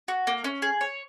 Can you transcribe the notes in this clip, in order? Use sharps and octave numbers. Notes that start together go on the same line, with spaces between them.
F#4
A#3
C#4
G#4
C#5